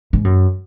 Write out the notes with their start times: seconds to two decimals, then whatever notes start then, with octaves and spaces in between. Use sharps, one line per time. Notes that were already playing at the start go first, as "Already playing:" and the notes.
0.13 G#2
0.25 F#2